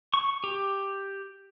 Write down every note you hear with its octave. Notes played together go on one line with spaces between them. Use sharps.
C#6
G4